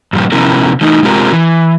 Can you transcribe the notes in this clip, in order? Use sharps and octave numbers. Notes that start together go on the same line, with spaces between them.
G2 A#2 F3 G3
C3 F3 B3 C#4 E4 A#4
E3 A3 D#4
C3 G#3 C4 F4 G4 A#4
E3